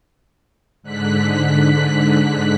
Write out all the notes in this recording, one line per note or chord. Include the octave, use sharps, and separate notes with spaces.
G#2 D3 F#6 B6